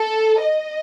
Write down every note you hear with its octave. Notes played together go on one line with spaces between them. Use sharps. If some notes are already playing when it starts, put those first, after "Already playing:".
Already playing: A4
D#5